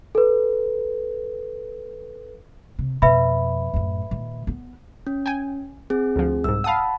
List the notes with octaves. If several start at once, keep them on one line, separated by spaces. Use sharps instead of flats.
A4 B4
C3
F2 B2 B4 E5 B5
F#2 A2
A#2 D#3
B3
C#4
G5 G#5
C4 G#4
D2 F3
C2 G#2 E6
F5 F#5 A5 B5 D#6